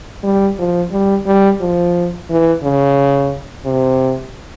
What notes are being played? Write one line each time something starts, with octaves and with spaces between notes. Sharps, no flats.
G3
F3
G3
G3
F3
E3
C#3
C3